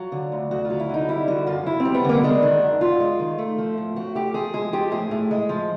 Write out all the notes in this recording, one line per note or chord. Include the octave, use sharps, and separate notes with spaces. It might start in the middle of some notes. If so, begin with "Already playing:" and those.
Already playing: F#3 F4
D3
D2
D2 F#4
F4
F#3
E4
D3 D#4
G3 E4
D3 F#4
F#2 F4
F#2 E4
C4
G3
B3
D3 A#3
G#3 D4
D#3
F#2
F#2 F4
G#3
D#3
A3
F3
A2
A2 F#4
A3 G4
F3 G#4
G#3 G#4
F3 G4
A2 G#4
A2
G#3
F3